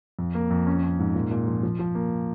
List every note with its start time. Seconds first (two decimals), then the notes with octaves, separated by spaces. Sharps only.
0.19 F2
0.35 A#3
0.51 F2
0.67 C#4
0.83 C#4
0.99 G#2
1.15 A#2
1.31 A#2
1.47 F3
1.63 F3
1.79 F3
1.95 A#3